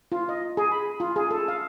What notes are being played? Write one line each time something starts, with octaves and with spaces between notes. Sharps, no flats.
F4
D#5
G#4
B5
F4
G#4
A4
F5